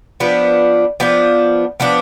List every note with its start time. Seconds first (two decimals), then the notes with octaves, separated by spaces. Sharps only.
0.20 F3 B3 D4
1.00 F3 B3 D4
1.80 F3 B3 D4